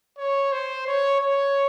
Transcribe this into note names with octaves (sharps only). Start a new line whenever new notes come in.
C#5
C5
C#5
C#5